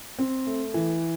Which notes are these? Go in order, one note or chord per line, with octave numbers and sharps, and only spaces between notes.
C4
A3
E3